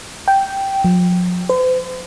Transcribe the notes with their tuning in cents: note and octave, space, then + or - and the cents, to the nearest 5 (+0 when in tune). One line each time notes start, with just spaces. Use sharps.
G5 -5
F3 +45
C5 -45